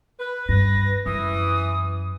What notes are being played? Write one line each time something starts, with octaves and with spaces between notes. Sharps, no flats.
B4
G2 A#6
F#2 E3 D#6